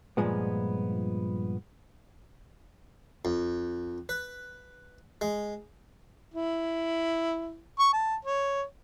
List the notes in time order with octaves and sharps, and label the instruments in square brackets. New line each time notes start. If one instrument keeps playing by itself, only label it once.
[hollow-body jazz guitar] G2 A#2 F3 G#3 B3
[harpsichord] F2
B4
G#3
[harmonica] E4
C#6
A5
C#5